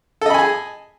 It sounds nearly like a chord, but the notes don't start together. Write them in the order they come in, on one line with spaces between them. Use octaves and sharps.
A4 D#5 B5 G#5 G#4